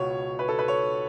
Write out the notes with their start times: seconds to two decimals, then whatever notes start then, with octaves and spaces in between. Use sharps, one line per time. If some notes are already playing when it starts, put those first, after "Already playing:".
Already playing: C#2 B2 C#5
0.39 B4
0.48 A4
0.59 B4
0.68 C#5